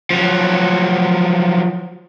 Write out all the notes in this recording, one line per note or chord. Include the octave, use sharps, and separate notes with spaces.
F3 F#3